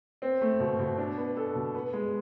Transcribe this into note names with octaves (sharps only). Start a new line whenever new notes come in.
C4
A3
B2
B2
D4
B3
A4
B2
B3
G#3